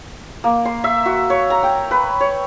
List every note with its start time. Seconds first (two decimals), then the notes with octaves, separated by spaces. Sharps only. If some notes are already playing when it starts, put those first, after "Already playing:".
0.44 A#3
0.65 C6
0.84 E5
1.06 F#4
1.30 C#5
1.50 A#5
1.63 G5
1.91 B4
2.21 C#5